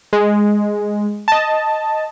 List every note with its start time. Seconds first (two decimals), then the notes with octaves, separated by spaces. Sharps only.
0.13 G#3
1.28 D#5 A5